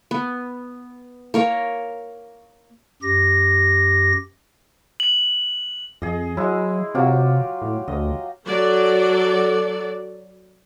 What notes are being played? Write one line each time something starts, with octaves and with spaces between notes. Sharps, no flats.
B3
A#3 A#4 C#5
F#2 G4 A#6
F#7
F2 G#4 D#5
F#3 G#3 E4
C3 F#3 F4 G4
A2
D2 D#5
F#3 A4 D5